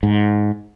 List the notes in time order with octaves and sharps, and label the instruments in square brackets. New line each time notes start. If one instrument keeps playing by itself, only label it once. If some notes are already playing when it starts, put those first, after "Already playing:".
[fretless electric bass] G#2